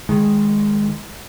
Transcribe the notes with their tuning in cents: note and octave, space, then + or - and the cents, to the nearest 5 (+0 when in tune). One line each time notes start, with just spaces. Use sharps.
D#3 +5 G#3 -5